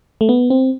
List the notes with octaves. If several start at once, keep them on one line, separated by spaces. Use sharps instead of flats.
A3
B3
C4